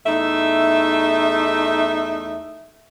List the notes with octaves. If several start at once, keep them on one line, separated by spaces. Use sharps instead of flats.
E2 A3 D#4 E5